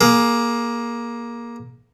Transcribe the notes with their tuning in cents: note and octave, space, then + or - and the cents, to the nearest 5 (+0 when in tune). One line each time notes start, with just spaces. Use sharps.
A#3 +15 G#4 +30